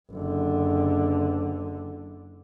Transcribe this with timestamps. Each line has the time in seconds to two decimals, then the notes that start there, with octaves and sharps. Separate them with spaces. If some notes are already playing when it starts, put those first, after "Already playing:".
0.11 F#1 D3